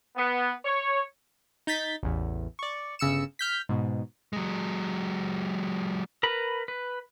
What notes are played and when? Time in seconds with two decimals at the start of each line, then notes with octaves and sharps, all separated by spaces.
0.16 B3
0.65 C#5
1.67 D#4 G6 A6 B6
2.03 A1 E2
2.59 D5 C#6
2.99 G1 C#3 E6 C#7 E7
3.39 F6 G6 B6
3.69 G#2 B2
4.33 F#3 G#3
6.23 A#4 B4 B5
6.68 B4